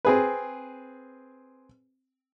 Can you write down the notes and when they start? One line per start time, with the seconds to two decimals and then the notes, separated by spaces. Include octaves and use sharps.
0.05 C4 G#4 B4